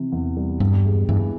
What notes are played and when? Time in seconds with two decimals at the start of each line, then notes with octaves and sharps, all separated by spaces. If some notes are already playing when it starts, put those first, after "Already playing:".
Already playing: C3 E3
0.12 E2
0.37 G3
0.60 G2 B3
0.85 G#3
1.08 G2 E3